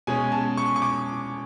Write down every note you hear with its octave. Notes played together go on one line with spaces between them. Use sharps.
B2 G#3 C#4 G#5
A5
C#6
C#6
D6